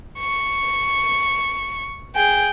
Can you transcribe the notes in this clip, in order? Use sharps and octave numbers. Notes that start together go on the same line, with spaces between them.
C#6
G#4 G5